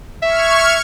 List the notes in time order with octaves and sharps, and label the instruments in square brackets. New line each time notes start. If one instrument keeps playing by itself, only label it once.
[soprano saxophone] E5 [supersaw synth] C#6 F6 G#6